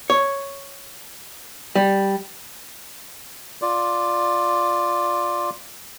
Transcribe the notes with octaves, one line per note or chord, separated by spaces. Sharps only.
C#5
G3
F4 D5